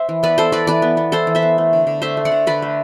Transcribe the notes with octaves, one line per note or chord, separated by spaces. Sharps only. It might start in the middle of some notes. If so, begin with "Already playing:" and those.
Already playing: C5 E5
E3
B3 B4 D5
B3 A4 C5
E3 B4 D5
E3 B4 D5
B3
B3
E3 A4 C5
E3
C5 E5
B3
A3
D3
D3
A3 C5 E5
A3
D5 F#5
D3
D3 B4 D5
A3